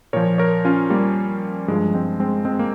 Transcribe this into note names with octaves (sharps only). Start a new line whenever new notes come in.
A#2 F3 A#4 C#5
A#4 C#5
C#4 F4
G3 A#3
G2 F3 G#3
G#3 C4
G#3 C4
G#3 C4
A#3